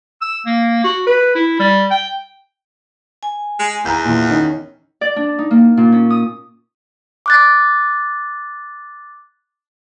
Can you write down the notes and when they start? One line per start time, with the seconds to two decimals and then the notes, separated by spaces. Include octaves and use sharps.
0.21 E6
0.46 A#3
0.84 F#4
1.07 B4
1.35 E4
1.60 G3
1.91 G5
3.23 G#5
3.59 G#3
3.85 E2 A#5 G6
4.05 A#2 E3
4.29 D#3 C#4 D#4
5.01 D5
5.16 D4
5.39 D#4
5.51 A#3
5.77 A#2
5.92 C#4
6.10 D#6
7.26 D6 F#6 A6